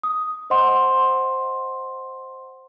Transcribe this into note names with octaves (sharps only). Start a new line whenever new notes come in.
D#6
C5 D#5 F#5 C6